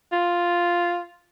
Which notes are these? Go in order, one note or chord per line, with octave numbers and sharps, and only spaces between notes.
F4